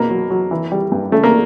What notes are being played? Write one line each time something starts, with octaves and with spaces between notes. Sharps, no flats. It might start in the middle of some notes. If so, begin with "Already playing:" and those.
Already playing: B2 A#3
F#3
F#3
E3
G3
G2
C#3 A3
A#3